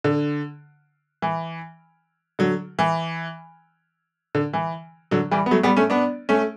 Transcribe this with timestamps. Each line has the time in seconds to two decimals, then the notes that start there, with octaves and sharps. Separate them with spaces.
0.04 D3
1.22 E3
2.39 D3 F#3
2.79 E3
4.35 D3
4.53 E3
5.11 D3 F#3
5.31 E3 G3
5.46 B3
5.51 F#3 A3
5.63 G3 B3
5.77 A3 C#4
5.90 B3 D4
6.29 A3 C#4